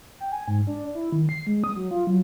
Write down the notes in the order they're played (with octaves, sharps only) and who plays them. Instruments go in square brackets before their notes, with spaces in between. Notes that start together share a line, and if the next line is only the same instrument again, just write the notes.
[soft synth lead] G5
G#5
G#2
D4
E4
D#3
C7
G#3
D#6
F#3
F4
F#3